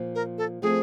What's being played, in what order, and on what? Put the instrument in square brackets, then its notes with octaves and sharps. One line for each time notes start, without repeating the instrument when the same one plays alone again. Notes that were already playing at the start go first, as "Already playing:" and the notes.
Already playing: [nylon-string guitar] A#2 F3 A#3
[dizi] A#4
A4
[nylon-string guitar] F3 A3 C4 [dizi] G#4